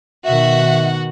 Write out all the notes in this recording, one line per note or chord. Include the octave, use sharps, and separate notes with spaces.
B2 D#3 F#4 E5 F#5